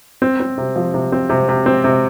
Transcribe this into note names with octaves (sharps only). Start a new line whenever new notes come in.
C4
C4
C3
F3
C3
C4
C3
C3
C4
C3